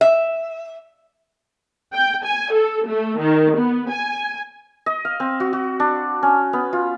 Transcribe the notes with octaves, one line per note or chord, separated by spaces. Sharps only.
E5
G5
G#5
A4
A3
D#3
B3
G#5
D#5
F5
C4
F#4
F#4
D4
C#4
B3
F4